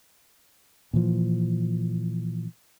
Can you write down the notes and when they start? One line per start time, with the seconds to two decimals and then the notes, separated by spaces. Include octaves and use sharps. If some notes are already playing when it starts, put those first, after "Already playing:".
0.93 A#2 E3 F3